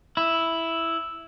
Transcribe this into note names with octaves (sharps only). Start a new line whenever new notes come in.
E4